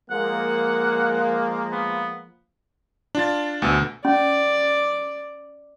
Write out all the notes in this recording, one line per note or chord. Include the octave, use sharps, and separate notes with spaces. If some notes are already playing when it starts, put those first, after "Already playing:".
F3 G#3 A#3 F#5
B3
D4 F4 A6
D2 B2 E6
C#4 D5